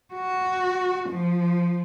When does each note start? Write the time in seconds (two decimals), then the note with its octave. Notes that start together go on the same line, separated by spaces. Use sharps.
0.14 F#4
1.09 F3